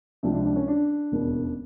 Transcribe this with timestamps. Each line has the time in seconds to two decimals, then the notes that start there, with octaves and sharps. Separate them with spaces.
0.23 C#2 C3 F3 D4
0.34 D4
0.45 D4
0.56 C#4
0.68 D4
1.12 E1 D#2 C#3